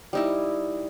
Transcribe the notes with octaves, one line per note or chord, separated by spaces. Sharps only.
G3 D#4 E4